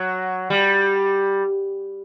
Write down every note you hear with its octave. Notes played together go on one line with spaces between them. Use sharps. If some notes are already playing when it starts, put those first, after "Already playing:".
Already playing: F#3
G3